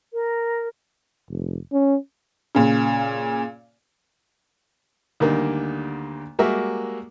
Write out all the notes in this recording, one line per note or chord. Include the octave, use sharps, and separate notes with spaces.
A#4
F1
C#4
A#2 C#3
D2 D3 D#3 G3 A#3
G3 G#3 A#3 F#4 A#4 E5